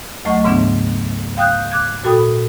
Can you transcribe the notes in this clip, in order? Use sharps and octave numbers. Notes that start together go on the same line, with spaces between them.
D2 F#3 A3 D#5 F#5 C#6
G#2 C#3 E3 B3 D4
F5 G5 D#6 F#6 G6
D6 F#6 G#6
A#2 F#4 A4 G5 B5 D#6